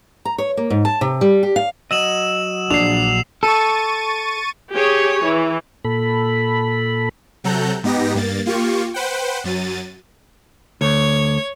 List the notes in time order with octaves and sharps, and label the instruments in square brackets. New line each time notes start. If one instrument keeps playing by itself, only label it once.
[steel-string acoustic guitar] A#5
C#5
A#3
G#2
A5
C3
G3
G4
F5
[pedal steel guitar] F#3 D#5 [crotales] E6 E7 F#7
[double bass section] A#1 [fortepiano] D4 [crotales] C7 F7
[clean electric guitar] A4 [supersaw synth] C#6 A6 D#7
[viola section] G4 G#4 C#5
E3
[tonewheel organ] A#2 A4 B5
[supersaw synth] C3 F#3 A4 A#5 F#6 G6
G#2 B3 D#4 G4 A#6
G2 A#3 A6
A#3 F4 G4 C#6
B4 C5 F#5 G5
F#2 F#3 A6 D#7
[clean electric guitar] D2 [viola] C#5